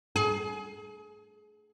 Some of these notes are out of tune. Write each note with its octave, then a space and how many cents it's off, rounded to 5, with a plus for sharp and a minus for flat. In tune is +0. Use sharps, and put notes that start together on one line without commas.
G#4 +25